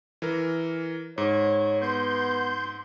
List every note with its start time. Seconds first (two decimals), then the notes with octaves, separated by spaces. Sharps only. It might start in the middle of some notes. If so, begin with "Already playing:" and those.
0.22 E3 A#4
1.18 G#2 C#5
1.82 B3 C6 G6